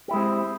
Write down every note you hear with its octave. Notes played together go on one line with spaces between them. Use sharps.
G#3 C4 E4 G4